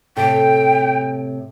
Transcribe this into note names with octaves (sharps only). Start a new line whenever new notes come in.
A2 C3 A4 G5